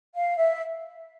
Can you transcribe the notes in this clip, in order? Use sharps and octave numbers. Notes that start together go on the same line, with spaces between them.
F5
E5